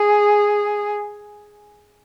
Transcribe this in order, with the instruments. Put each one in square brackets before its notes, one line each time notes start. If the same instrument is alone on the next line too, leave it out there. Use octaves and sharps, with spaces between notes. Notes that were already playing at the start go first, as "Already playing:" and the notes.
Already playing: [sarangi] G#4